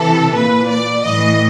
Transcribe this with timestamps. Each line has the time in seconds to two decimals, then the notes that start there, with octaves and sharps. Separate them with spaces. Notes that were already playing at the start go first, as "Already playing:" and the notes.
Already playing: C3 E3 A4
0.33 A#2 B4
0.69 D5
1.04 A2 E3 D#5